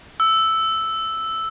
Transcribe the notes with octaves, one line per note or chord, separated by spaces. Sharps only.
E6